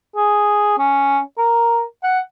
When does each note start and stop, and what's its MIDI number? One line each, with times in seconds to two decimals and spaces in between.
0.16 0.74 68
0.78 1.20 61
1.38 1.82 70
2.03 2.20 78